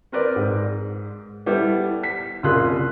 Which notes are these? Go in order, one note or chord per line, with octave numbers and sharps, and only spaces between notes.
C4 A#4 B4 D5
G#2
G3 B3 E4 A4
B6
F#1 C2 F4 G#4 C6 F#6